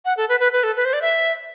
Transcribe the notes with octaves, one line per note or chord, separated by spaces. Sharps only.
F#5
A4
B4
B4
B4
A4
B4
C5
D5
E5